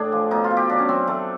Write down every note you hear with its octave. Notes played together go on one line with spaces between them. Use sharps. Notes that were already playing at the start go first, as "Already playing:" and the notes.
Already playing: A2 D4 G#4
F3
B2 D#4
F4
B2
G4
F#3 D4
C#4
F#3 C4
F#3 A3